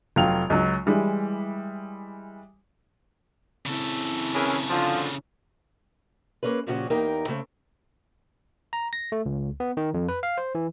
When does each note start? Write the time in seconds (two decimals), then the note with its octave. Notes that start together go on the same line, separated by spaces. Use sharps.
0.16 F1 F#3 F4 G5 F7
0.50 C#2 F#3
0.86 E3 G3 G#3 E4
3.66 C#3 C4 E4 A4
4.34 E3 C#4 G#4 A#4
4.70 D3 F3 F4
6.43 A#3 C#4 G#4 B4
6.67 A#2 C#3 F3 C#4 F#4 G4
6.90 E2 A#3 D#4 G4 A#4 G5
7.28 C#3 A3 C4
8.73 A#5
8.93 A#6
9.12 A3
9.26 C#2
9.60 B3
9.77 D#3
9.94 F2
10.09 B4
10.23 F5
10.38 C5
10.55 E3